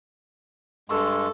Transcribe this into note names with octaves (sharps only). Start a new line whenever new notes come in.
G2 G#3 A4 C6 C#6 E6